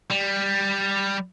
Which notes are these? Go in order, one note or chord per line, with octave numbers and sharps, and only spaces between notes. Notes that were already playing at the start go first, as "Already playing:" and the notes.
G3